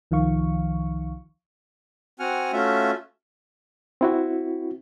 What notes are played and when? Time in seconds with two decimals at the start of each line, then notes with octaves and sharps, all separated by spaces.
0.11 C2 D#3 F3 F5 C#6
2.19 C4 F#4 F#5 G#5 F6
2.52 A3 C#4 F4 F#4 E5
4.01 C4 E4 F#4